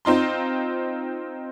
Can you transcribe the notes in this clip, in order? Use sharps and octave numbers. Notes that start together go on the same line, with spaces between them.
C4 D#4 F4 C6